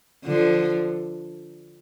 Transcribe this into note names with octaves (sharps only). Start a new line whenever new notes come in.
D3 F3